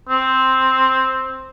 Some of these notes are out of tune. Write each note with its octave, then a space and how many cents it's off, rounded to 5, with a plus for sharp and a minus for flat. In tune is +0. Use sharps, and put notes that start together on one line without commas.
C4 +5